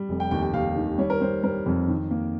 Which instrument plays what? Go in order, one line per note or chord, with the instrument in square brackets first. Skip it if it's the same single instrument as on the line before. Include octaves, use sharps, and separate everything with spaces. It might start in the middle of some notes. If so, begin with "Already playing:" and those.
Already playing: [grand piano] G3
F1
G5
D#2 G5
G5
D#2 F5
D#3
G3 C#5
A#4
G3 C5
G3 A#4
F2
D#3
A#3